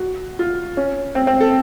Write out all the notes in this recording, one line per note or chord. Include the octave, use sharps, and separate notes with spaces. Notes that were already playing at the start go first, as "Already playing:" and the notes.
Already playing: F#4
F4
C#4
C4
C4
A4